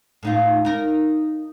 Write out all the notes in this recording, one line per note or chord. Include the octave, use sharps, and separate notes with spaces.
A2 D#4 F4
D#4 A#4